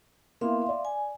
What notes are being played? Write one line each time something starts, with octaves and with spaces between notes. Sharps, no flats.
A#3 B3 E4 E5 F5 C6
D5
G#5